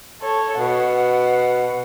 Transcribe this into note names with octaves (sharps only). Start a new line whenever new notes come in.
A4 C#5
B2 F#5